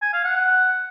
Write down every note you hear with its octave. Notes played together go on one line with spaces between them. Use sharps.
G#5
F5
F#5